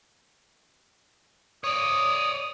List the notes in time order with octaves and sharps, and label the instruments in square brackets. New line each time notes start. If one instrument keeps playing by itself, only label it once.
[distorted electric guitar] C#5 D5 [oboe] D#6